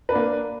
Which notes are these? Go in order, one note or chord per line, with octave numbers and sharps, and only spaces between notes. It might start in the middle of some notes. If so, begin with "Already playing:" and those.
A#3 D4 B4